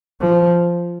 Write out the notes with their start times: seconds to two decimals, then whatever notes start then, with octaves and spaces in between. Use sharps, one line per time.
0.21 F3